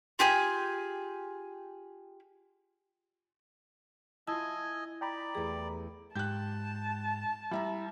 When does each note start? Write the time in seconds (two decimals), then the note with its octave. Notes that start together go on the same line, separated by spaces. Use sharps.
0.19 F4 G4 G#4 G#5
4.27 E4 F4 D#5 G#5 A5 E6 G#6
5.01 D5 G5 A#5 B5
5.35 E2 A3 G4 G#4
6.15 G#2 G4 A5 F#6 G6
7.51 G3 E4 E5 A#5